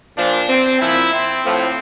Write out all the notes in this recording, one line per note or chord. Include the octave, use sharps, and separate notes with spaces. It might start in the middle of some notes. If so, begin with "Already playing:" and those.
A#2 F3 D4
C4
A#2 F3 E4
C4
A2 F3